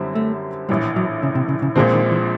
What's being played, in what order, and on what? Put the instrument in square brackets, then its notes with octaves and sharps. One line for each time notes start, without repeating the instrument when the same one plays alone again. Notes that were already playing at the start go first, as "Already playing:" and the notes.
Already playing: [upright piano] F#2 D3 G3 C4 E4
[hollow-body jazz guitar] A3
[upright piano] A#1 A2 E3 [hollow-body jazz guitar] G3
[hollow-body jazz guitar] F#3
C#3
C3
C#3
C#3
[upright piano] A#1 A#2 F3 G#3 C4 [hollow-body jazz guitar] D3
[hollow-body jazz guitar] D#3
E3